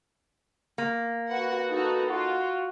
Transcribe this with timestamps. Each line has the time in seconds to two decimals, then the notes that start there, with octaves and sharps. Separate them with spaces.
0.78 A#3
1.31 F#4 B4 F#5
1.69 D#4 F#4 A4
2.09 F4 F#4